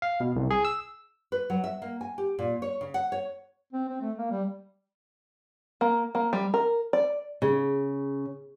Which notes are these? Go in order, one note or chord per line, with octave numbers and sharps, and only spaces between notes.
F5
B2
C2
G#4
E6
B4
F#3
E5
A#3
G#5
G4
A#2
C#5
C#3
F#5
C#5
C4
C4
A3
A#3
G3
A#3
A#3
G3
A#4
D5
C#3